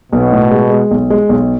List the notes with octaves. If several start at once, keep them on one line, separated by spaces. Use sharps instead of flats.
B1 B2
A2
G#3
G#3
B1
G#3
B1